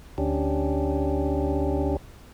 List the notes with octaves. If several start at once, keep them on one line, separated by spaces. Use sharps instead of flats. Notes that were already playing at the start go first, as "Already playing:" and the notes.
D2 C#4 D4 G4